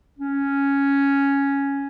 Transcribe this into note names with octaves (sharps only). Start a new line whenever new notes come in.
C#4